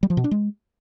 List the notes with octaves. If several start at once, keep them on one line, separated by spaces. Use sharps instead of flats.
G3
F3
B2
D4
G#3